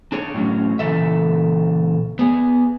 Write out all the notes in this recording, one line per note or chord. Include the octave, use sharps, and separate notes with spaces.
D4 G#4 C#5
A2 F#3 C#4
A#2 C#3 E3 A4 E5
B3 G#4